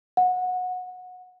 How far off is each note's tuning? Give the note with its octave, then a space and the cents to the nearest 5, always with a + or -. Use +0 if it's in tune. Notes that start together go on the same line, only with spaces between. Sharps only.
F#5 -20